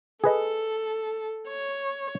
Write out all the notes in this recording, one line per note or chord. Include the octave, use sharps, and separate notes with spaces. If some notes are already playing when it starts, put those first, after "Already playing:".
G#4 A4 B4 D#5
C#5